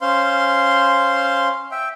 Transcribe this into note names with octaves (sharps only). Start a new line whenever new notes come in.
C#4 C5 F5 C6
E5 G5